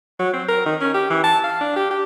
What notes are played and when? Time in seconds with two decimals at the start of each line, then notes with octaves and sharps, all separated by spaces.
0.19 F#3
0.33 C4
0.48 A#4
0.65 D#3
0.81 C#4
0.94 G4
1.10 E3
1.24 A5
1.44 F5
1.61 D4
1.76 G4
1.91 G4